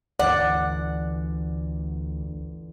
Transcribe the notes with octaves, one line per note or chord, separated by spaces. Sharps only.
G1 D2 E3 D5 F#5